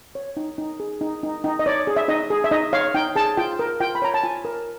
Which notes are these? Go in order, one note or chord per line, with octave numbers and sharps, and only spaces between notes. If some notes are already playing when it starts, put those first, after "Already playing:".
C#5
D#4
D#4
G#4
D#4
D#4
D#4
D#5
C#5 D5
G#4
E5
D#4 D#5
G#4
E5
D#4 D#5
C#5 F5
D#4 G5
G#4 A5
F4 G5
A#4
F4 G5
B5
C#5 A#5
A5
F4 G#5
A#4